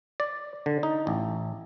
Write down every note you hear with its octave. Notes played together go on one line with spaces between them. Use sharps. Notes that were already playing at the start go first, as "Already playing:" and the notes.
D5
D3
D#4
A1